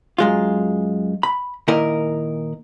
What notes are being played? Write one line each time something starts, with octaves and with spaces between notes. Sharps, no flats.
F#2 G#3 F4
B5
A#2 D#3 E4 A#4 D#5